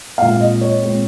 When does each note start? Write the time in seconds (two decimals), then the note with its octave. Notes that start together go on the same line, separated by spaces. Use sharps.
0.18 A#2 G#3 C4 F5
0.40 D#5
0.61 C#5
0.83 A#2 G#3 C4